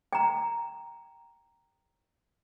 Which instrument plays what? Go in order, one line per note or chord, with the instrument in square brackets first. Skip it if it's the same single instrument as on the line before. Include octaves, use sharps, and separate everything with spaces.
[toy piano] G5 A#5